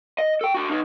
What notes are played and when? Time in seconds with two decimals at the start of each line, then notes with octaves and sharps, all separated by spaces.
0.18 D#5
0.41 A4 G5
0.55 D4 F#4
0.71 B2 D#4